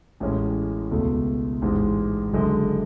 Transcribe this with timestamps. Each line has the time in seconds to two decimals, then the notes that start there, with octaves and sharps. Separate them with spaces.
0.20 A1 A2 G#3 C#4
0.91 C#2 B2 A3
1.62 A1 G#2 G#3
2.33 F#1 F#2 D3 G#3